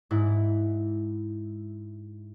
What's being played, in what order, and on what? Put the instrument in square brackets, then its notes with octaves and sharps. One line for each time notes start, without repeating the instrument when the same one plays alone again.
[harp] G#2 E4